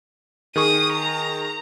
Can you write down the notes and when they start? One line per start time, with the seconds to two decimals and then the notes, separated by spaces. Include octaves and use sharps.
0.56 D#3 G#4 C#6 D#6
0.93 A#5